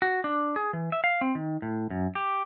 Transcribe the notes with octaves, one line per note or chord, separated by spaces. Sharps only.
F#4
D4
G#4
E3
E5
F5
C4
D#3
A2
F#2
G4